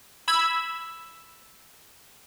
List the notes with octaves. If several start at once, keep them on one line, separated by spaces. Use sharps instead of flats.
B5 E6 G#6